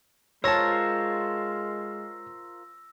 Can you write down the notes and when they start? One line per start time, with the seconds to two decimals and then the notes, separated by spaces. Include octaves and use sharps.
0.44 G#3 F4 A#4 C5 C#5 A5 E6 A#6